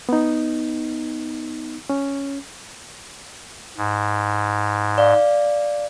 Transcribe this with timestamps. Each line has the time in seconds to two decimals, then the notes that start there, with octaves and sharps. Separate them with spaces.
0.09 B3 D#4
1.90 C#4
3.77 G#2
4.98 D5 F5